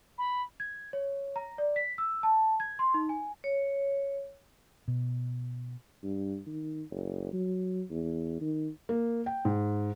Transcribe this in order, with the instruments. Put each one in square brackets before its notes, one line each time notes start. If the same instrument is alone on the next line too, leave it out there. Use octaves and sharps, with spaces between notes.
[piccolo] B5
[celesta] G#6
C#5
A#5
D5
B6
E6
A5
G#6
C6
D#4
G#5
[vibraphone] C#5
[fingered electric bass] B2
[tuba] G2
D#3
F#1
F#3
E2
D#3
[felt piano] A#3
G5
G#2